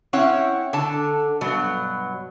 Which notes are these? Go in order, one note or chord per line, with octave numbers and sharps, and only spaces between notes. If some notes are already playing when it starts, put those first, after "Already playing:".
C4 C#4 E4 C#5 F#5
D3 A5
G2 B2 F#3